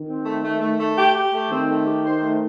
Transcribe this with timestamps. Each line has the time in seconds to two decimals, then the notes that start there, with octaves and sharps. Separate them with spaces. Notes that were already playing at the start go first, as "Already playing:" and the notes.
Already playing: D#3
0.08 C4
0.25 A3
0.43 A3
0.61 A3
0.79 A3
0.97 G4
1.15 G4
1.33 A3
1.51 D#3 C4
1.68 A3
1.86 G4
2.05 C5
2.23 A3